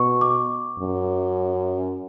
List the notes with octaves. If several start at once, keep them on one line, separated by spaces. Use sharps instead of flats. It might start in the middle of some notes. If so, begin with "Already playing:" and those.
Already playing: B2 C#6
D6
F#2